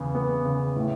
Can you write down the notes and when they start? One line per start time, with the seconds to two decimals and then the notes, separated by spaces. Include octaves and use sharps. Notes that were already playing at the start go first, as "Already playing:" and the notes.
Already playing: E2 C#3 B3
0.15 B3
0.45 C#3
0.76 A2